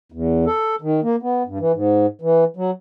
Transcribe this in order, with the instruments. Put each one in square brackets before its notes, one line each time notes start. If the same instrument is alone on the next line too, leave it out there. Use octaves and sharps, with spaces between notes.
[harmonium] E2
A4
D#3
A#3
B3
G2
E3
G#2
E3
F#3